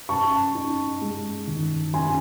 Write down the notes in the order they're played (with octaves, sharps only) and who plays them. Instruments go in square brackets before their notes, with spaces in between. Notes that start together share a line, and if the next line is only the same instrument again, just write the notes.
[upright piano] F#2 A5 C#6
D#4
G#3
D#3
F#2 G#5 C6